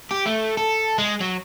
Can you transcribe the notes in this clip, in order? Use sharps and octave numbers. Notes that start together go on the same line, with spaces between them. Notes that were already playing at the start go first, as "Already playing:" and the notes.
G4
A3
A4
G#3
F#3